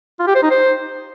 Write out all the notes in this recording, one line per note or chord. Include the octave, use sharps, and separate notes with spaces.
F4
G4
C5
D#4
C5